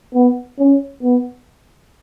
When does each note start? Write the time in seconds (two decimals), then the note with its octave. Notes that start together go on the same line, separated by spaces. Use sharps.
0.14 B3
0.59 C#4
1.03 B3